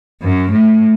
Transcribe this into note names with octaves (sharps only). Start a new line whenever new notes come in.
F#2
A2